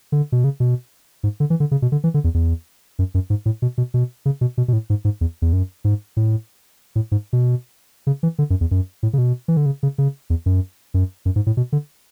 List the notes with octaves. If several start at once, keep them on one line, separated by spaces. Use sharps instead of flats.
D3
B2
C#3
B2
G#2
D3
E3
D3
C#3
B2
D3
E3
D3
E2
E2
F#2
F#2
G#2
A2
B2
B2
B2
C#3
B2
B2
B2
A2
G#2
G#2
E2
E2
F#2
G#2
A2
A2
G#2
B2
C#3
E3
D3
F#2
E2
F#2
A2
C#3
B2
E3
D3
C#3
C#3
C#3
E2
F#2
F#2
F#2
G#2
A2
B2
D3